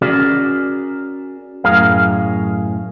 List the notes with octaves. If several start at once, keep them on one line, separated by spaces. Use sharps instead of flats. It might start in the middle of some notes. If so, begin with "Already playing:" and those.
C#4 F#4 G#4 A#4 D5
F#2 A2 G#4 A#4 F5